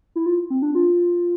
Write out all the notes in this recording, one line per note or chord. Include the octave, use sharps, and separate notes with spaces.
E4
F4
C4
D4
F4